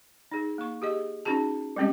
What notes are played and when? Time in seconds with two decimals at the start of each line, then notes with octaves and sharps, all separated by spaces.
0.32 D#4 G#4
0.58 A#3 C#6
0.82 G4 G#4 D#5
1.25 C#4 D#4 F#4 G#4 A5
1.76 G3 G#3 C4 C#4 G4 D#5